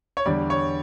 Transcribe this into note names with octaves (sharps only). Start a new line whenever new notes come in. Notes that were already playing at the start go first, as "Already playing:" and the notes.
C#5
E2 D3 G3 D5
C#5